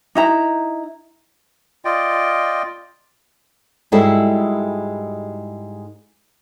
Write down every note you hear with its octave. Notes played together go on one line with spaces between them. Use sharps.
D#4 E4 A#5
F4 D5 D#5 G5
G#2 G3 G#3 E4 F#4 A4